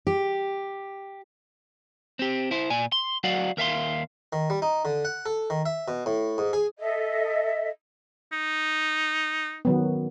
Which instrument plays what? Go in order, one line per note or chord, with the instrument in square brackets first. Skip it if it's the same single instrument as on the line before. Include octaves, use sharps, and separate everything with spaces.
[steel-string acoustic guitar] G4
[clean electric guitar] C4 G4
E4 C5
A#2 D5 G#5
C6
F#3 F#4 D5 F5 F#5
D#2 A#4 E5 F5 C6
[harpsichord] D#3
G3
D#4
D3
F#5
A4
D#3
E5
B2
A2
G#2
G#4
[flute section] A4 D#5 E5
[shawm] D#4
[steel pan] D#3 F#3 B3